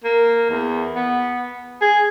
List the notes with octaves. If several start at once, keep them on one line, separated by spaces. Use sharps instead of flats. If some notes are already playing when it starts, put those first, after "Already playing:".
A#3
E2
B3
G#4